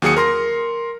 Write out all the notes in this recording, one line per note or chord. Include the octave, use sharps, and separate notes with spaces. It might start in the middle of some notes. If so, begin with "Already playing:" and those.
D#2 F#3 G#4 D#6 C#7
A#4 C6 A#6